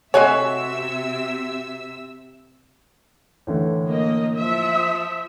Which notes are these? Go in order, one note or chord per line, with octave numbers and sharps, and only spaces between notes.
C3 G#3 A3 F#4 C#5 E5 G#5 E6
A2 D3 E3
A#3 D#5
F3 E5
D#6